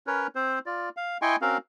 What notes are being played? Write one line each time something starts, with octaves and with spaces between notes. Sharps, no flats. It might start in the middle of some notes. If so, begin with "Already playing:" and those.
C#4 A#4 B4 C#5
C4 C5
F4 D5
F5
E4 D#5 G5 G#5 C6 C#6
C4 C#4 F#4 A#4 F5